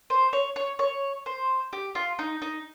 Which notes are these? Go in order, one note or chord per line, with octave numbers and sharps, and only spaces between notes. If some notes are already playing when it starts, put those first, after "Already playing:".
C5
C#5
C#5
C#5
C5
G4
F4
D#4
D#4